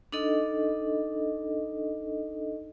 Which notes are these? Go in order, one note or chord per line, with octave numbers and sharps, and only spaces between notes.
D4 D#4 A4 D#5